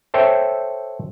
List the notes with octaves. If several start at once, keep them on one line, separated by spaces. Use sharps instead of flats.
A4 C5 C#5 E5 G5